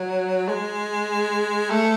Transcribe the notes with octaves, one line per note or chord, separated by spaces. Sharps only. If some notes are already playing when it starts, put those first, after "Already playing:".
Already playing: F#3
G#3
A3